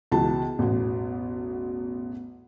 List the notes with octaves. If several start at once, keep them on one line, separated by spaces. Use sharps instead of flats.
C#2 B2 E3 A5
A1 E2 B2